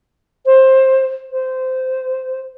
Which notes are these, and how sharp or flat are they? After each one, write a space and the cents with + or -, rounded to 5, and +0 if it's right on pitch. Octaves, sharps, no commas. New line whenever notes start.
C5 +15
C5 -15